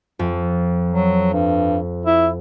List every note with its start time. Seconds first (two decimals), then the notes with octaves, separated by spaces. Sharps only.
0.19 F2
0.91 F#3
1.33 G2
2.06 E4